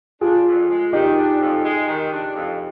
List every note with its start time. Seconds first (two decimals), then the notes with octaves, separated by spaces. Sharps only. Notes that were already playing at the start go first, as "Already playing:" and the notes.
0.21 D4 F4 G#4
0.46 F2
0.69 G#3
0.93 D#3 D#4 G4
1.17 D4
1.40 F2
1.64 G#3
1.88 D#3
2.12 D4
2.35 F2